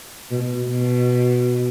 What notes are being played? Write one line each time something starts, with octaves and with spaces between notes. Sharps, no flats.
B2
B2